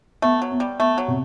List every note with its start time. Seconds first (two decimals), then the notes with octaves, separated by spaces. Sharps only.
0.22 A3 B3
0.42 F#3
0.52 B3
0.60 G3
0.80 A3 B3
0.98 F#3
1.08 C3